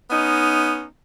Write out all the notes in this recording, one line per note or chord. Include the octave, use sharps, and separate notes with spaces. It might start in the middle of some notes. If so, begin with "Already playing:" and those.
B3 C#4 D#4